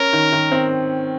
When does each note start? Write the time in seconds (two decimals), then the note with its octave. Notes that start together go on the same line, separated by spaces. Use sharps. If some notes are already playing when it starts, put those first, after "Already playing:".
Already playing: C#4 A#4
0.13 D#3
0.32 D#3
0.52 C4